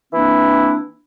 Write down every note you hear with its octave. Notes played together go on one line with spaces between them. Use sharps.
E3 A#3 C4 D4 E4